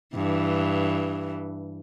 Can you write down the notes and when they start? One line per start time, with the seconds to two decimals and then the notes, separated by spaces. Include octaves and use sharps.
0.15 G2 E3